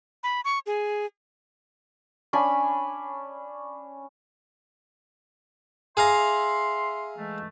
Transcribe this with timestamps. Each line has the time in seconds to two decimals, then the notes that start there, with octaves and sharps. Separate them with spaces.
0.23 B5
0.45 C#6
0.66 G#4
2.33 C#4 D4 G#5 B5
5.97 G#4 E5 F5 A#5 C6
7.18 E3 G#3 A3